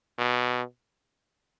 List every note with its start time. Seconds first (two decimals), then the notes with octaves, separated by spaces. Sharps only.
0.19 B2